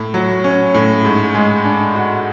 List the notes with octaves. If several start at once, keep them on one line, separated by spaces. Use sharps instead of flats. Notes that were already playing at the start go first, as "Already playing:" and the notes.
Already playing: A2
F#3
C#4
A2
G#2
G#3
D4
F#4